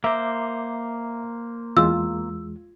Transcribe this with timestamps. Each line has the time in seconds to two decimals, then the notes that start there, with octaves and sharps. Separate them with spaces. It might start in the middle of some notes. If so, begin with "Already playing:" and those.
0.04 A#3 C5 E5 A#5 D6
1.77 E2 G#3 F4 E6